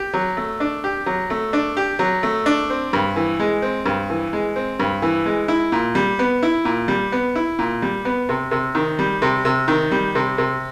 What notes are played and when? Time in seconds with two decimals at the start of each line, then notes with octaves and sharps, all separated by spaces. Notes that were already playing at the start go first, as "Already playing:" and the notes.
Already playing: G4
0.13 F#3
0.37 A3
0.60 D4
0.84 G4
1.06 F#3
1.30 A3
1.53 D4
1.77 G4
1.99 F#3
2.23 A3
2.46 D4
2.70 C4
2.93 G2
3.16 E3
3.39 G#3
3.62 C4
3.86 G2
4.10 E3
4.33 G#3
4.56 C4
4.80 G2
5.02 E3
5.26 G#3
5.48 E4
5.72 A#2
5.95 G3
6.19 B3
6.43 E4
6.65 A#2
6.88 G3
7.12 B3
7.35 E4
7.59 A#2
7.82 G3
8.05 B3
8.29 C3
8.51 C3
8.75 D#3
8.99 G3
9.22 C3
9.45 C3
9.68 D#3
9.91 G3
10.15 C3
10.38 C3